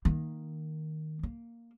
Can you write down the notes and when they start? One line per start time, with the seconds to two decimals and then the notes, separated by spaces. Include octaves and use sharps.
0.05 D#3 A#3
1.23 A#3